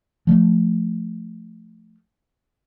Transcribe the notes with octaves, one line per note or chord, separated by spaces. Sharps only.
F3 A3